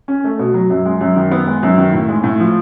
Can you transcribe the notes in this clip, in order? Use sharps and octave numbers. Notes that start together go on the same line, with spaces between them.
C#4
A3
B2
F#3
F#2
G#3
F#2
D#3
B3
G#3
F#2
D#3
A2
G#3
A2
F3